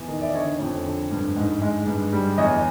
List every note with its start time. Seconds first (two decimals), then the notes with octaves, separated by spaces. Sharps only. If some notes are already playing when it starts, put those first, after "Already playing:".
Already playing: E2
0.08 D#3
0.21 D5 E5
0.34 D3 C#5 D#5
0.60 F2
0.85 D3
1.11 G2
1.36 G#2
1.62 G#3
1.87 G2
2.13 G3
2.38 E2 C#5 D#5